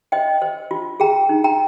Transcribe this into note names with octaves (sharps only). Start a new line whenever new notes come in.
C5 D#5 G5
C5
F4
G#4 G5 A#5
D#4
G5 A#5